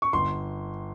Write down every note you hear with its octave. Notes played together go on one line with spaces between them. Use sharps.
C#6
G1 C6